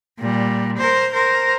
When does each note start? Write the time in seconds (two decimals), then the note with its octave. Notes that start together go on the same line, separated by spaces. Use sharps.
0.20 A#2 G3
0.78 A#4 C5
1.12 A#4 C5